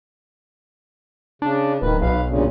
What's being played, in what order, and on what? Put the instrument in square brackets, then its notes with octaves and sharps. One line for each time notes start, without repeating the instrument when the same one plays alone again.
[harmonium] C#3 [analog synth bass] D4
[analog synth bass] D1 [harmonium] D#3 B4
[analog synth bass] B1 [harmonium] B4 F5
[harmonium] G2 A#2 C#3